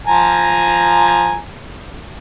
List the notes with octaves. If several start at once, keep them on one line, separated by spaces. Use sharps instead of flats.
F3 G#5 A#5